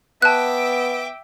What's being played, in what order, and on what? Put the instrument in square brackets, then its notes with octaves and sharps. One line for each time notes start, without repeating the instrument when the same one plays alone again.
[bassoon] B3 [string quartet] E5 G5 D6 [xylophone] A5 F#6